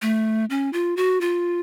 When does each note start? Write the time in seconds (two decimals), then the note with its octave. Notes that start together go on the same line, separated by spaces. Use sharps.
0.02 A3
0.50 C#4
0.73 F4
0.97 F#4
1.21 F4